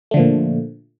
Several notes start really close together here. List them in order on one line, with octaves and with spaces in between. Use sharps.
A3 D3 F3 A#2